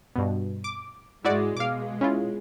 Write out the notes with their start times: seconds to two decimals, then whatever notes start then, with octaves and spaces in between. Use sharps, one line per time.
0.16 G2 B2
0.64 D6
1.25 G#2 G#3 E4 F#4 D5
1.57 B2 G#3 F5 D6
2.01 C#4 E4 F4